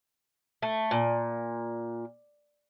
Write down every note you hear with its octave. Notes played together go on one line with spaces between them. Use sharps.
A3
A#2